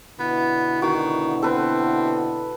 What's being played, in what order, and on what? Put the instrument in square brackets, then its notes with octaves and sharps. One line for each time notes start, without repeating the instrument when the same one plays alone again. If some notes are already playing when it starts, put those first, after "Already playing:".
[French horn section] B2 D3 E4 [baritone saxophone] B3
[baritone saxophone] D#3 [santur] F#4
[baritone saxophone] C4 [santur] A4 B4